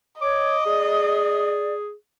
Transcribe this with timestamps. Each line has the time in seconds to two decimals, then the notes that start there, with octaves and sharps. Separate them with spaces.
0.21 C#5 D#5 D6
0.66 G#4 D5